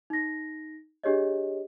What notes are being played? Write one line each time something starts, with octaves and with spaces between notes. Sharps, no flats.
D#4 A#6
D4 G4 G#4 C#5 D#5